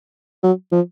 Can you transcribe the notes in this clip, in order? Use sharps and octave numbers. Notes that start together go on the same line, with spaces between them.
F#3
F3